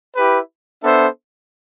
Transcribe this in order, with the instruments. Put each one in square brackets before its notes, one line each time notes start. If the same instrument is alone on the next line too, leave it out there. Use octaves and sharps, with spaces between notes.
[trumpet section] E4 G4 B4
B3 D4 A4 C5 E5